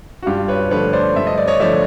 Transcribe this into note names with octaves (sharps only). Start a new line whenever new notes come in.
F#4
G2 F4 G4
B4 C#5
D3 F3 A3 B4 C#5
C5 D5
G2 E5
D#5
D5
C#5 D#5
D3 F3 A3 D5 E5